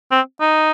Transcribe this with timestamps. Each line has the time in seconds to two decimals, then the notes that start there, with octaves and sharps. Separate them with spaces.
0.11 C4
0.40 D#4